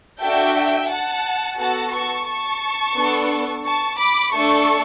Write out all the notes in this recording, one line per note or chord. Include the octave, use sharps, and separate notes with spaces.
D4 F#4 A4 E5 G5
F#5 A5
B3 F#4 A4 F#5 A5
A5 C#6
A5 C#6
B3 D4 A4
A5 C#6
B5 D6
A3 D4 A4 A5 C#6